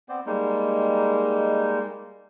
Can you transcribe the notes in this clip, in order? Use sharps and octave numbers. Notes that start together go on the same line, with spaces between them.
B3 C4 C5 D5
G3 G#3 A#3 D#4